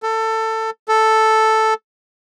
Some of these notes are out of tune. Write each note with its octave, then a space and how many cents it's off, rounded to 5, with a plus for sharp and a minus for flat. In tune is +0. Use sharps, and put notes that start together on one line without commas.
A4 +20
A4 +0